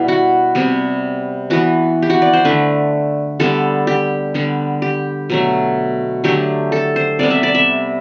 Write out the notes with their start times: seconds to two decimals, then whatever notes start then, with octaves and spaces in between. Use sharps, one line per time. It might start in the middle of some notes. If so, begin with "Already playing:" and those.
Already playing: B2 G3 B3 E4
0.08 F#4
0.55 C3 G3 B3
1.50 E3 B3 F#4
2.02 G4
2.10 F#4
2.22 D5
2.33 C5
2.45 D3 A3 B4
3.40 D3 G3 B3 A4
3.87 G4
4.34 D3 G3 B3
4.82 G4
5.30 B2 F#3 A3
6.24 D3 F#3 A3 G4
6.72 A4
6.96 C5
7.19 C3 G3 B3 D5
7.31 E5
7.43 D5
7.55 E5